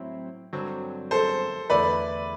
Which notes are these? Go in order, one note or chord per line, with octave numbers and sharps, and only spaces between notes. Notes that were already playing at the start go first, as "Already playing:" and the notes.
Already playing: A2 F#3 C4 E4
G2 D3 F#3 C4
A4 C5
E2 D3 A3 E4 B4 D5